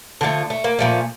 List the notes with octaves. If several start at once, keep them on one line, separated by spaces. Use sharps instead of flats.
D3 F3 A3
A3
A#3
A#2 F3 A3